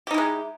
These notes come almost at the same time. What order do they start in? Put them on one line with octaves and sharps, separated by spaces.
G4 D#4 E4 G#3